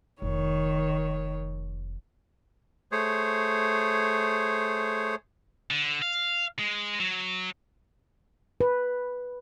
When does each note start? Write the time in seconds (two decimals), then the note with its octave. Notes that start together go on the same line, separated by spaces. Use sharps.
0.22 F1 D#3 C#5
2.92 A3 G#4 C5 C#5
5.71 D3
6.02 F5
6.59 G#3
7.00 F#3
8.61 B4